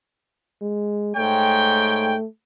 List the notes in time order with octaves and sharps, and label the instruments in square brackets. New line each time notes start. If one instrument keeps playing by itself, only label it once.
[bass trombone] G#3
[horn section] G#2 C#5 G5 [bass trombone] A3